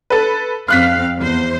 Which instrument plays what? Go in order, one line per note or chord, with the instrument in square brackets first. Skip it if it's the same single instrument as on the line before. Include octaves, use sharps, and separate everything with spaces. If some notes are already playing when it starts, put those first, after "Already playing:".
[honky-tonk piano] A4 B4
[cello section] F2 C4 F5 [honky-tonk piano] F6 F#6 B6
[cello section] E2 C5